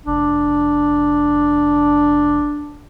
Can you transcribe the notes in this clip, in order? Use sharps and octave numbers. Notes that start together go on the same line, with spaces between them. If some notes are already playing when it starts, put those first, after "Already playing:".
F1 D4